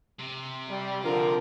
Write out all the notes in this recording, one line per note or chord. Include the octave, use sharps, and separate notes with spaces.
C3
G3
D3 F3 F4 A#4